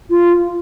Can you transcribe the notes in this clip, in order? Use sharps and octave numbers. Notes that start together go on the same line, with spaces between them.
F4